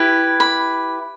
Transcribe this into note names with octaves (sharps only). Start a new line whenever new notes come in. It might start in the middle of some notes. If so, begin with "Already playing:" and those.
Already playing: E4 G4 B4
B5